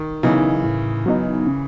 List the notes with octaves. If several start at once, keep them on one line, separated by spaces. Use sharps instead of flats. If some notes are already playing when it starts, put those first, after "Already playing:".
Already playing: D#3
C#3 E3 F#3 B3 D#4
A2
F#3 B3 D#4
C#3